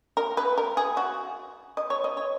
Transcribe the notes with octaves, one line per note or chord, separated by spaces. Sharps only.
A#4
B4
A#4
G#4
F#4
D#5
C#5
D#5
C#5